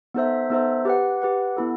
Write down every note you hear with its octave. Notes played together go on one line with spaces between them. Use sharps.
B3 D#4 A4 C5 E5
B3 D#4 A4 C5 E5
G4 B4 F#5
G4 B4 F#5
B3 E4 A4